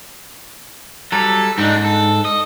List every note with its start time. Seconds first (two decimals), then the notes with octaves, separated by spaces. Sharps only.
1.12 F#3 G3 A4
1.58 G#2 D4 D#4
1.85 A4
2.25 D#5